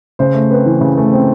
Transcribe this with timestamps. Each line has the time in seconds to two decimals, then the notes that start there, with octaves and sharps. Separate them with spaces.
0.19 C#3 C5
0.34 A3
0.51 C4 B4
0.66 E3
0.81 C#3
0.98 A3
1.13 C4